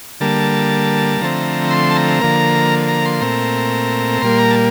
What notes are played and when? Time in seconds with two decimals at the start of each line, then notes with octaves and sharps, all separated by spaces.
0.20 D3 G3 A#3 A5
1.21 D3 F3 A3 C4 A#5
1.71 C6
1.90 A5
1.96 A#5
2.21 D3 F3 A#3
2.88 A#5
3.05 C6
3.21 A#2 A3 C4 A#5
4.21 A#2 G3 A#3 C6
4.39 A#5
4.51 A5